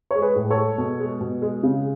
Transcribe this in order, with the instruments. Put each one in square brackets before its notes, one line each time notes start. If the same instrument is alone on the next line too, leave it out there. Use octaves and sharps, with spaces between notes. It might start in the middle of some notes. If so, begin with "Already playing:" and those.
[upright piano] G#3 C#5
G#4 B4
A2
A4 C#5
G#3
B2
G#3
B2
G#3
C#3